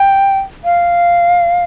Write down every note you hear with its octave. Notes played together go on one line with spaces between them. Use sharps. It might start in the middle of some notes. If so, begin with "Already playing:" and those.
Already playing: G5
F5